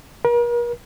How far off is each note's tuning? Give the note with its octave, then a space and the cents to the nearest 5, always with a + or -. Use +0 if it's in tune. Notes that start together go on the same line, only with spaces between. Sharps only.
A#4 +40